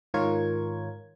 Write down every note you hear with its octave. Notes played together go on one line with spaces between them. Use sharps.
G#2 D#3 F4 A#4 C#5 G#6